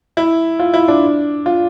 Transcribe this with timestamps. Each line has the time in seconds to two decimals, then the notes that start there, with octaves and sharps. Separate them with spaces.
0.17 E4
0.59 F4
0.74 E4
0.88 D4
1.46 F4